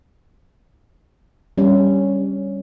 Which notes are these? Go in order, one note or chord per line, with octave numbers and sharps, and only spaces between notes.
G3 C#4